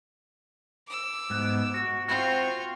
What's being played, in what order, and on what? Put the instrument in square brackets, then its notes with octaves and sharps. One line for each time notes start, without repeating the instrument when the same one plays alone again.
[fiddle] D6 E6
[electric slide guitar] G#2 B3
F#4
[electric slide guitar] C4 F#4 [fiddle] F4 C#6